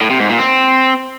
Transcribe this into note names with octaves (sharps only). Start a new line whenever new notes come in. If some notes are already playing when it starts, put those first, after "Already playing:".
A2
C3
G#2
A#2
C4